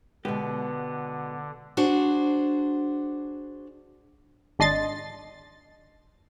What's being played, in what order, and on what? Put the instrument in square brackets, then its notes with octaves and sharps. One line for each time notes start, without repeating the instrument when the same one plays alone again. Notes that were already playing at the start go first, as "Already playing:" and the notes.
[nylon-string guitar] B2 G#3 [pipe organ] D3 [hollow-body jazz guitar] B3 G4
[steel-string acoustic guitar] D4 F#4 G#4 C5
[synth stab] G#1 D4 D#5 C6 A6